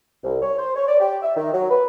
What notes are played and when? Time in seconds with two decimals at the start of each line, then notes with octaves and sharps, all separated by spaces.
0.23 C2
0.42 C#5
0.58 C5
0.76 C#5
0.88 D5
1.00 G4
1.22 E5
1.36 D#3
1.53 F#3
1.69 B4